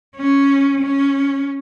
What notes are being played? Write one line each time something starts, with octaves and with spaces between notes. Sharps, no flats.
C#4
C#4